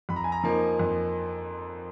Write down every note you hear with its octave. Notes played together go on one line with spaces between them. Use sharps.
F2 B5
A#5
G#5
A#5
F3 A#3 D#4
F2